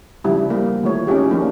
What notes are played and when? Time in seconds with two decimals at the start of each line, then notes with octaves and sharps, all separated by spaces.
0.24 C#3 F3 G3 D4 E4 G4
0.50 A#3
0.83 D#3 E3 A3 F4 C#5
1.07 C#4 D#4 F4 G4 G#4
1.31 F3 A#3 D4 D#4